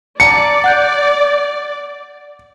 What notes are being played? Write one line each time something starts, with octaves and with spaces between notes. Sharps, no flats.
D5 A5 A#5 C#7
F#5 F#6 G6